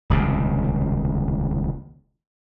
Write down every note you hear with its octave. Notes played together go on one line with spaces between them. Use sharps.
D#1 C#2 C3